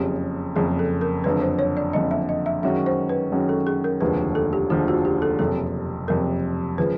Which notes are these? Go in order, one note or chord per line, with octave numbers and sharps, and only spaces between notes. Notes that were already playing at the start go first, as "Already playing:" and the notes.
Already playing: F#1 F2 C#3 G4
F#1 F2 C#3 G#4
A4
A#4
F#1 F2 D3 B4
C5
C#5
D5
F#1 F2 D3 D#5
E5
D#5
E5
F#2 D#3 G#3 C#4 F#4 E5
C5
B4
F#2 D#3 G#3 C#4 F#4
A4
G#4
A#4
F1 D#2 D3 F3 G#3 B4
A4
G4
F1 D#2 D3 F3 G#3 F4
F#4
G4
A4
F#1 F2 C3 A4
F#1 F2 C3 A#4
C#3 F3 G#3 B4